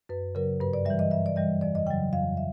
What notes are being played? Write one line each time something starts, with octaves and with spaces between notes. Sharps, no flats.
F#2 B4
C#3 F#3 A#4
G2 B4
D5
E3 G3 E5
D#5
G2 E5
D5
E3 G3 D#5
F2 D5
D#5
C#3 F#3 G5
F2 F5
E5